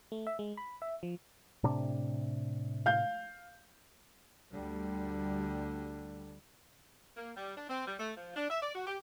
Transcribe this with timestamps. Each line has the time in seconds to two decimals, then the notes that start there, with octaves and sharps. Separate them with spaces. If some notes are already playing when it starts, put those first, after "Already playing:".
0.12 A3
0.27 E5
0.39 G#3
0.57 B5
0.82 E5
1.03 F3
1.63 A2 C3 D4
2.86 F5 G6
4.53 D2 D3 G3
7.17 A#3
7.36 G3
7.57 D4
7.69 C4
7.87 G3
7.99 A3
8.17 F3
8.36 D4
8.50 E5
8.62 D5
8.75 F#4
8.87 G4